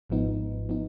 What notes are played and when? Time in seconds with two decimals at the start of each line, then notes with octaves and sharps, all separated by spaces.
0.10 G#1 G#2 F3 B3 D#4
0.69 F3 B3 D#4